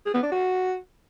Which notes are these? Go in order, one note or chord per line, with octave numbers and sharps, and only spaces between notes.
G#4
B3
D4
F#4